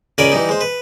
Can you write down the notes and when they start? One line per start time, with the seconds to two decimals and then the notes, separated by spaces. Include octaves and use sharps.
0.18 C#2 C#3 A#4 D5 G#5 B5
0.32 E3 G3 D#4
0.49 G#3 C5
0.61 B4